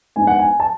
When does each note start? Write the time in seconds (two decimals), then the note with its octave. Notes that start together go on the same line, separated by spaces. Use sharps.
0.16 G#2 G#3 B3 D4 G#5
0.27 F#5
0.39 G#5
0.60 A5